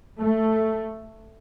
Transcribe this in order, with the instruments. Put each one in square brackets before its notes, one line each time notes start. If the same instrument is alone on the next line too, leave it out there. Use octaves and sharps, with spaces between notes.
[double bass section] A3